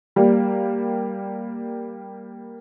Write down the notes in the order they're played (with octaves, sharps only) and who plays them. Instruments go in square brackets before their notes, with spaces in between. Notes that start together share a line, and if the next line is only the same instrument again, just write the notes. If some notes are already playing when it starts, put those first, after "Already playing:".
[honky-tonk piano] G3 A#3